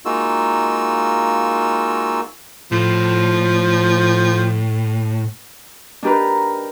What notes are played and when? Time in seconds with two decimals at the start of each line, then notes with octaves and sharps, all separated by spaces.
0.05 G#3 A#3 D#4 F4 F#4 E6
2.72 A2 F3
6.03 D4 D#4 G4 A#4 B4